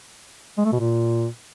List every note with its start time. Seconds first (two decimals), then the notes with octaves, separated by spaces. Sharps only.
0.58 G#3
0.65 A3
0.72 B2
0.79 A#2